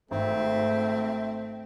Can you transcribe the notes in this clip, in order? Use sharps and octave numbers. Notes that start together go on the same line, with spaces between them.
G#1 A3 C4 E5